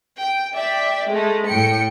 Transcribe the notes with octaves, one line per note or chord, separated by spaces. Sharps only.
G5
D5 E5 G5
G#3 A3
A2 G5 C#7